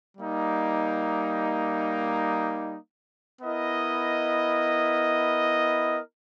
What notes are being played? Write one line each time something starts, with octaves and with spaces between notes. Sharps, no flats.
G3 A#3 D#4
B3 E4 A#4 D#5